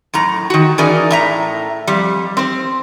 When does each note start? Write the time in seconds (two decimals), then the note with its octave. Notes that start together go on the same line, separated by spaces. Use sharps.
0.13 F#2 A2 A#5
0.50 D#3 F#4
0.78 E3 C#4 D#4 G#4 A#4 D5
1.11 A2 E5 A#5
1.87 F2 G3
2.37 C4 C5